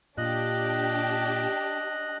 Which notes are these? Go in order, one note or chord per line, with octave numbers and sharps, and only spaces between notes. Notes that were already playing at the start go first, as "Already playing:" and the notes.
A#2 D4 G4 D#5 F#6